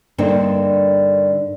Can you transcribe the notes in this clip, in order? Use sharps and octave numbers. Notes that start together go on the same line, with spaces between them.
G2 D3 A#3 C4 D4 D#4